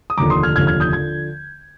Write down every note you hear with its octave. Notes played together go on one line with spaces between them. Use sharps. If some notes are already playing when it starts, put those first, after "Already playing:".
D#6
F1 D#2 D3 F3 A#5 D6
C6 D#6
F6 G#6
F1 D#2 D3 F3 F6 G#6
F6 G#6
D#6 G6
D3 F3 G#6